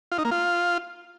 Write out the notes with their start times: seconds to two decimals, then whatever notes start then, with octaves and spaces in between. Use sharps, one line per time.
0.12 F4
0.18 D#4
0.25 A#3
0.31 F4